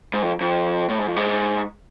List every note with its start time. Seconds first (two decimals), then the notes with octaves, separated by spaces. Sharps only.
0.14 G#2
0.23 F2
0.41 F2
0.89 A2
0.99 G#2
1.07 F2
1.16 G#2